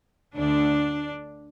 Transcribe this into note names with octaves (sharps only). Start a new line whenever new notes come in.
D2 D3 D4